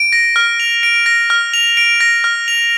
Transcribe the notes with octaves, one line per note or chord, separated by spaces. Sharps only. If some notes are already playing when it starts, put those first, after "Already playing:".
Already playing: D7
A#6
F6
F7
D7
A#6
F6
F7
D7
A#6
F6
F7